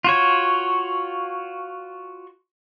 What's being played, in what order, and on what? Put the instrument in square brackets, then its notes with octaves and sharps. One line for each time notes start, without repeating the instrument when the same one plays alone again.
[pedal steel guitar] F4 F#4 C#5